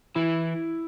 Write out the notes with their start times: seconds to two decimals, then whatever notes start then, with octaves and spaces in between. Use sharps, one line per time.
0.15 E3 E4